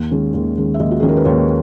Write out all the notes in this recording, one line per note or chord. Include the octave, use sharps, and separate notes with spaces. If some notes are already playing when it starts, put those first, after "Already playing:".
Already playing: D#2
D#3 G#3 C#4
D#2
D#3 G#3 C#4
E5
D#2 D#5
F#4
D#3 G#3 C#4 G#4
A#4
B4
D#2 C#5